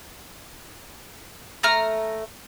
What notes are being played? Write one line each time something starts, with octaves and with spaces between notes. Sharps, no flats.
A3 A#5 F6